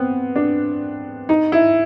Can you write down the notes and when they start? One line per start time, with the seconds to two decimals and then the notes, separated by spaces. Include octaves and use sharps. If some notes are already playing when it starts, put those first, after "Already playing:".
Already playing: B3 C4
0.36 D4
1.29 D#4
1.52 E4